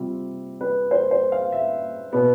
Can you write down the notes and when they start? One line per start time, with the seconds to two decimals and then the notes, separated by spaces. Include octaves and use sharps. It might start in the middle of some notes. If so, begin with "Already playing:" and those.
Already playing: C3 G3 C4 F4
0.61 B4
0.91 C5
1.11 C5
1.32 F5
1.52 E5
2.13 B2 B3